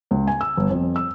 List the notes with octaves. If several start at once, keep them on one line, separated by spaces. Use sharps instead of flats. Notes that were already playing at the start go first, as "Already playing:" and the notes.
C#2
G#5
E6
G1
F2
E6